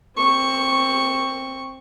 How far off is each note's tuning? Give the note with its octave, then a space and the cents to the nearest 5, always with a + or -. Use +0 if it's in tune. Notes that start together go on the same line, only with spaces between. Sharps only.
C4 +15 C#6 +0